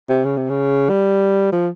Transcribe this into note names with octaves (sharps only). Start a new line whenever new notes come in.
C3
C#3
C3
C#3
G3
F3